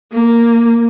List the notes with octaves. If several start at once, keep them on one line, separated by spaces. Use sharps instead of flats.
A#3